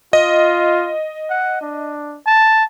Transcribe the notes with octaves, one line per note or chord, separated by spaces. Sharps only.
F4 D#5
F#5
D4
A5